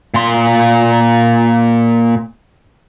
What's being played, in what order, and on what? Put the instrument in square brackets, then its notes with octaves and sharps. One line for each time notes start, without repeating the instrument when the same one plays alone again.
[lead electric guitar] A#2 C6